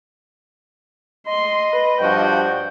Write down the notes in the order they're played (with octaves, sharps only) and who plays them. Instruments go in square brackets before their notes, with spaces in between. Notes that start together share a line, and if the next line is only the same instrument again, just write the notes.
[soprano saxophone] D#5 [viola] C6
[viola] B4
[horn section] G2 F3 F#4 [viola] G5